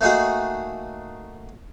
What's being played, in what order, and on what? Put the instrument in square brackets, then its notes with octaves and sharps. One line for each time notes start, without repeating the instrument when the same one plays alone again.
[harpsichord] A3 A#3 D#4 F#4 G#4